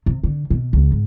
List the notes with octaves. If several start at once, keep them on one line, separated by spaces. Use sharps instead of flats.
C3
D3
B2
C#2
G#2